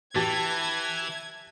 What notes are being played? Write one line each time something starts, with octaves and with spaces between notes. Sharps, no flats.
E3 G4 A5 G#6 A6